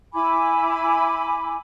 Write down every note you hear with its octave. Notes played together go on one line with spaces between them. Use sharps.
E4 G#5 B5 D6